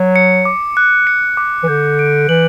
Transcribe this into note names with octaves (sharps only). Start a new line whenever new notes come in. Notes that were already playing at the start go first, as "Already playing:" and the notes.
Already playing: F#3
C#7
D6
F#6
C#7
D6
E3
D3 G6
D7
E3 F#7